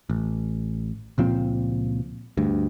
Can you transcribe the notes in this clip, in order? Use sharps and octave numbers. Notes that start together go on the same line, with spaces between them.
A1
C#2 A#2 F3 C4
D2 G2